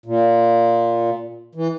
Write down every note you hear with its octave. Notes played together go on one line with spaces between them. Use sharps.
A#2
E3